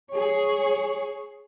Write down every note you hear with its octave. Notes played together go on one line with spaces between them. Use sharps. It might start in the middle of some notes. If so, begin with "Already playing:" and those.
G#4 C#5